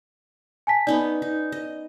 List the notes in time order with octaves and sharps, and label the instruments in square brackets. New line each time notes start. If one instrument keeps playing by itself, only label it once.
[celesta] G#5 A5 B6
[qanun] B3 C#4 D#4 [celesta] D5
[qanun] D#4
D#5